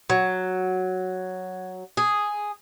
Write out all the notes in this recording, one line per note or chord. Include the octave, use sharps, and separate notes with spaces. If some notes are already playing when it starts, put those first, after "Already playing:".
F#3
G#4